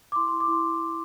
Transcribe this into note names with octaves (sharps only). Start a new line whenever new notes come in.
D6
E4 C6
C6
E4
D6
E4 C6